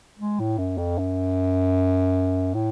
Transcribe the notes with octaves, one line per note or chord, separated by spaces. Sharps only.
G#3
A2
F#2
F2
F#2
A2